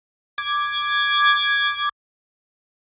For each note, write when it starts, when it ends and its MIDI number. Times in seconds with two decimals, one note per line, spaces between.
0.38 1.89 86
0.38 1.89 92